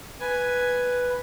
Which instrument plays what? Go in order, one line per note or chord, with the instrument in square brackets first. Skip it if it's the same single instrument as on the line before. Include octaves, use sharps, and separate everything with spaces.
[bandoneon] B4 [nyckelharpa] G#5